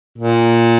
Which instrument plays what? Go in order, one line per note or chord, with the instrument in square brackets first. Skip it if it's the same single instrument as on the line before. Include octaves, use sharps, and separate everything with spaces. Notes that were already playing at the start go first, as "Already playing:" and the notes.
[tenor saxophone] A#2